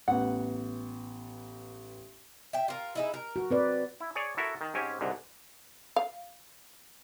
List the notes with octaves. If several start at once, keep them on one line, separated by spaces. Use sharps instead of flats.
A1 B3 F#5
E5 G5
F4 A#4
G#3 D#4 E4
A#4
F#4
C4 B4 D5
E4
G#4 C#5 D5 G#5
E4 F#4 A4 A#4 E5
D#3
G#2 C4 C#4 G4 G#5
C2 G#2 D3
F5